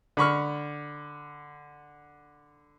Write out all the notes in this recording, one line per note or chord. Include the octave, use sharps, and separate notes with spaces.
D3 B5 C#6 F6